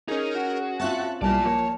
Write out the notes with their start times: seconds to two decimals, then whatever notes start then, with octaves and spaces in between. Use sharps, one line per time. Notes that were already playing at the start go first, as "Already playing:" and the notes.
0.08 C#4 D#4 G#4 A#4
0.35 F#4
0.80 C4 C#4 F4 E5 A5 C#6 F#6
1.22 B1 G3 A#3 E4 F4 D5 A5
1.45 F3 A#3 C#5